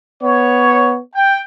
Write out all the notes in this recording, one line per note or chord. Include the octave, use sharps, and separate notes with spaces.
B3 C#5
G5